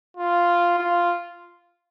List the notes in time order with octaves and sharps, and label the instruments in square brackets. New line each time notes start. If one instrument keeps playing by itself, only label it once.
[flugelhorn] F4
F4